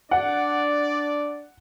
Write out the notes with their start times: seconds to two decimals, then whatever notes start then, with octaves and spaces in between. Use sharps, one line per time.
0.11 D4 D5 F#5